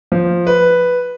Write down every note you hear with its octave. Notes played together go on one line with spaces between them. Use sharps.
F3
B4